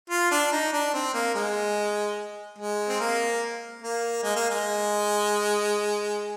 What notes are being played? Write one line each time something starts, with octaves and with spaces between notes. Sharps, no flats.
F4
D4
D#4
D4
C4
A#3
G#3
G#3
C4
A#3
A#3
G#3
A#3
G#3